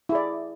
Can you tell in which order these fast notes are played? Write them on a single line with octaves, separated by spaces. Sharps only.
E4 G#4 D5